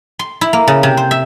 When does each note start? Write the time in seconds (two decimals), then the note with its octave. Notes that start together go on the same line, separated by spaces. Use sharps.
0.19 C6
0.41 E4
0.53 A#3
0.68 C#3
0.83 C3
0.97 C5
1.11 E5